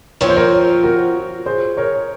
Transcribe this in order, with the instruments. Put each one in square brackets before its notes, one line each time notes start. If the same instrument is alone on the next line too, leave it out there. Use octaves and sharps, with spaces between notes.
[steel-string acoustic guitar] F3 C4 F4 [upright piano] C#5
[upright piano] C5
A#4 C#5
F#4 A#4
G#4 C5
A#4 C#5